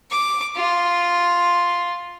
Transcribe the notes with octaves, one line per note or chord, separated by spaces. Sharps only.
D6
F4